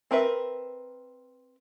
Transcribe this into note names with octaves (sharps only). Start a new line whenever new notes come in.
C4 A#4 B4 E5